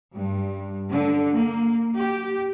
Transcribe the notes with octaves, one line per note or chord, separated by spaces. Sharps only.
G2
D3
A#3
G4